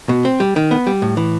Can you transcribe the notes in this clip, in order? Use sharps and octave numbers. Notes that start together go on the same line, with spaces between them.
B2
C4
G3
D#3
B3
G3
A2
E3